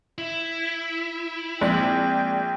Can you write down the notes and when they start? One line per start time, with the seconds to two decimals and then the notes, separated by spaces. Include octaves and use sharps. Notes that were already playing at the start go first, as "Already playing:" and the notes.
0.18 E4
1.61 A#1 G#3 C4 D5 G5